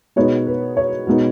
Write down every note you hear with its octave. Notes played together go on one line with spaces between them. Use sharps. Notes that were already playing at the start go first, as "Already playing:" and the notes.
B2 G#3 B3 D#4 C#5
B4
C#5
B2 G#3 B3 D#4